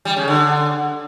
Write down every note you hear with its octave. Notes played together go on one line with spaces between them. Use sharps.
G3
C#3
D3